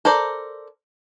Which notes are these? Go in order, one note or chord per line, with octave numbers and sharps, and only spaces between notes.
A4 A#4 C5 D5